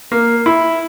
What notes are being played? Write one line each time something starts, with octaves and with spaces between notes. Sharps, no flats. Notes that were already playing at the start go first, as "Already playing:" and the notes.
A#3
E4